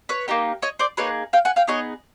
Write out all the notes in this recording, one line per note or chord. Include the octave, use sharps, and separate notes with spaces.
B4 C#5
A#3 D#4 G4
C#5 D#5
C5 D5
A#3 D#4 G#4 B4 C#5
F5 G5
F#5 G#5
F5 G5
B3 D#4 G#4 C#5 D#5